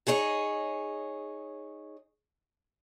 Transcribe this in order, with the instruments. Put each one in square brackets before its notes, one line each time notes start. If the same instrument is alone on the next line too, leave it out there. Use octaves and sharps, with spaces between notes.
[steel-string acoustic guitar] D#4 G#4 C#5 D#5